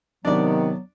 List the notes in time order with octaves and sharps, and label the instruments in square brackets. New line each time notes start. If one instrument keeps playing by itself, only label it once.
[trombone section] C3 D#3 [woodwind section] F#3 B3 [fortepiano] D4 D5